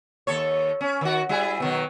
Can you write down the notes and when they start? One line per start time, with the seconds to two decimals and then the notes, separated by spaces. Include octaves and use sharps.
0.27 D#2 A4 C#5
0.81 C#4
1.01 D#3 F#4
1.29 G3 E4 G#4
1.60 B2 D#3 F#3